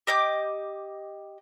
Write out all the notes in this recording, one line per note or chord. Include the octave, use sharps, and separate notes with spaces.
G4 D#5 D6 G6